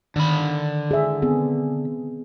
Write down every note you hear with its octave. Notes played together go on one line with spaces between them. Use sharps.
D3 D#3 B5
G#4 E5
B3 C4 G#4